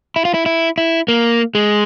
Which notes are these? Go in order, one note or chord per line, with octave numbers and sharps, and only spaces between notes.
E4
F4
E4
E4
E4
A#3
G#3